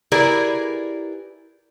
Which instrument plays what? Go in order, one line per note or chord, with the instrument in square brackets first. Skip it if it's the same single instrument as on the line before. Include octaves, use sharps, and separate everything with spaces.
[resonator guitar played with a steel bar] E4 G4 G#4 A#4 B4 D5